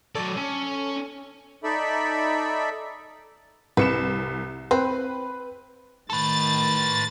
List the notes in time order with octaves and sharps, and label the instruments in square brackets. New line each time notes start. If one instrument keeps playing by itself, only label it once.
[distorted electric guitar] F#3 D5 [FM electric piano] A4 C#5
[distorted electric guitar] C#4
[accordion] D#4 A4 D5 E5 B5
[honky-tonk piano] C2 C#7 E7 [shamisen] B4
[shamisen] C4 [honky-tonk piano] B4
[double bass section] A2 D#3 [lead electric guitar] A4 B4 [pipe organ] A6